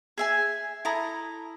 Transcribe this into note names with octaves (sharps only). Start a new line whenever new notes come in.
G#4 E5 G#5
E4 A4 A#5 D#6